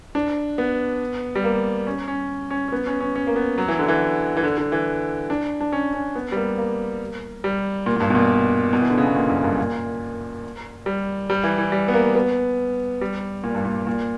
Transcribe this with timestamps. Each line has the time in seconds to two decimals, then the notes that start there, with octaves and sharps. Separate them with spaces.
0.15 D4
0.58 B3
1.35 G3
1.44 A#3
1.87 C#4
2.08 C#4
2.50 C#4
2.68 C#4
2.72 B3
2.87 C#4
3.00 C#4
3.15 C#4
3.27 A#3
3.36 B3
3.58 F#3
3.68 E3
3.79 D3
3.88 E3
4.37 E3
4.44 D3
4.58 D3
4.72 E3
5.30 D4
5.61 D4
5.72 C#4
5.94 C#4
6.15 B3
6.32 G3
6.36 A#3
6.58 A#3
7.44 G3
7.86 A#2
7.96 A#2
8.00 G2
8.10 B2
8.15 A#2
8.73 B2
8.82 E3
8.90 D3
8.98 C#3
9.07 B2
9.16 A#2
9.29 F#2
9.44 G2
9.58 A#2
10.86 G3
11.30 G3
11.44 E3
11.58 E3
11.72 G3
11.88 B3
11.94 A#3
12.15 B3
13.01 G3
13.44 A#2
13.55 G2
13.65 A#2
13.87 A#2